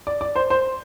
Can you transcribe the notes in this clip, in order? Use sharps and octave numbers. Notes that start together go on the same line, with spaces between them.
D5
D5
C5
C5